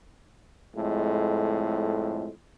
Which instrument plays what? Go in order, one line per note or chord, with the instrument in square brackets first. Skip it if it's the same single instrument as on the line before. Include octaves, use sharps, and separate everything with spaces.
[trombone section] F2 A2 G#3